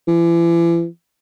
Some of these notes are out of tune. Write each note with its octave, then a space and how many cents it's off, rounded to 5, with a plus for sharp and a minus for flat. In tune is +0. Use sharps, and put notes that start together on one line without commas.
E3 +40